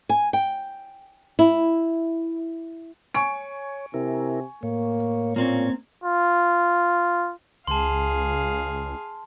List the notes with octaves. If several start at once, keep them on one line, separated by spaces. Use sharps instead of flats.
G#5
G5
E4
C#5 G#5 C#6 D7
C3 E4 A#4
A2 A#3 C#5
A#2 A#3 C4 C#4
F4
C#2 G#4 F5 A5 C6